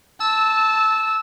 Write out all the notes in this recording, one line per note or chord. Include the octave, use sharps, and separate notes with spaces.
A5 E6